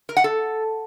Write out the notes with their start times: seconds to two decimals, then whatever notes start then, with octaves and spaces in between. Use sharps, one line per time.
0.09 A#4
0.17 F#5
0.24 A4